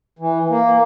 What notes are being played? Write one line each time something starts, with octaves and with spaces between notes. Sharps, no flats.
E3
A#3